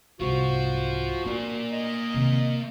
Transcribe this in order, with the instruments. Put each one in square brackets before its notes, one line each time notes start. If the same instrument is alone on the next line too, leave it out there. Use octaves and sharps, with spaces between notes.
[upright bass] C2 G#2 [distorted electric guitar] F4 C5 [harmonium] F#4
[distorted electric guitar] A#3 D5 [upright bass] D4
[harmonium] D#5
[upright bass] C3 D#3